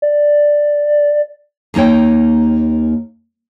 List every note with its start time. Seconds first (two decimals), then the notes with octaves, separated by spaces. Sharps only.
0.02 D5
1.74 D#2 A#3 D#4 C#5 G5